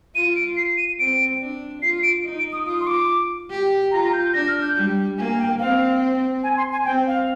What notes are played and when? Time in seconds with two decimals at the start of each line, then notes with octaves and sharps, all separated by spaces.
0.15 F4 D#7
0.36 D7
0.57 C7
0.77 D#7
0.99 C4 D7
1.41 D4
1.82 F4 C7
2.03 D7
2.25 D#4
2.39 D7
2.53 D#6
2.67 F4 D#6
2.80 C6
2.87 D6
3.50 G4
3.91 F4 A#5
4.03 A#5
4.13 G6
4.23 G6
4.33 D4 A#6
4.48 F6
4.62 G6
4.76 G3
5.18 A#3 G#5
5.38 G5
5.59 C4 F5
6.43 G#5
6.57 C6
6.72 G#5
6.85 C4 G5
7.07 F5